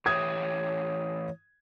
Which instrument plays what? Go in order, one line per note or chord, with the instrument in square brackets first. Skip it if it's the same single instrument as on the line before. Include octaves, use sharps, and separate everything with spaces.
[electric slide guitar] A2 E3 G4 [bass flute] C#5 [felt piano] D#6 G#6